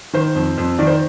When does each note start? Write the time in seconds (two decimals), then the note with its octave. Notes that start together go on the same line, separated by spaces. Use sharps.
0.13 D#3 C5
0.35 F2
0.58 F2
0.79 D#3 D5
0.87 C5